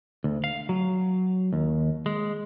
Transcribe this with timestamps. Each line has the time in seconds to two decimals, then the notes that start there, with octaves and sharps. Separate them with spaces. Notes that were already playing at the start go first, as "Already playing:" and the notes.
0.24 D2
0.44 F5
0.69 F#3
1.53 D#2
2.06 G#3